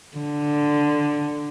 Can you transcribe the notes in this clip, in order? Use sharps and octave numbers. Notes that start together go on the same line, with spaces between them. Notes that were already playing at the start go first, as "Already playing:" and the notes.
D3